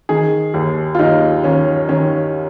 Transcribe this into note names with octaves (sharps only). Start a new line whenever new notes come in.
D#3 G#4
D#2
F4
D#2 D#4
D#3 C#4
D#3 C#4